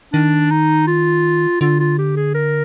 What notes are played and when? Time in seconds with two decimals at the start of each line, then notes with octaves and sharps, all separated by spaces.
0.13 D#3 D4
0.51 D#4
0.87 F4
1.61 D3 F4
1.80 F4
1.98 G4
2.17 G#4
2.34 A#4